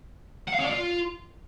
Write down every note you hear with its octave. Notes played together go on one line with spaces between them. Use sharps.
F#5
F5
C#4
D5
F4